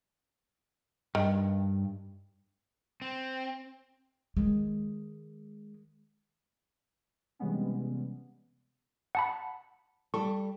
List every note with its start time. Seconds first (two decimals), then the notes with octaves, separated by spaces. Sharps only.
1.15 G2 D#3
3.02 C4
4.37 D#3 G#3
7.39 C3 E3 G3 G#3 B3 C#4
9.15 F#5 A5 B5
10.14 G3 A4 C#6